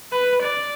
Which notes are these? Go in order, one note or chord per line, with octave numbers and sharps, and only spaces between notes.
B4
D5